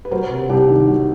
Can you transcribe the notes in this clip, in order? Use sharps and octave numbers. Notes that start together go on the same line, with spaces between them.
B4
F#3 A#4 C5
C3
C2 G4
D#3
F#3